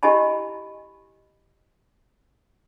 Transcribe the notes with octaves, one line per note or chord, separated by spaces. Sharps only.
E4 G4 D#5 G#5 A5 B5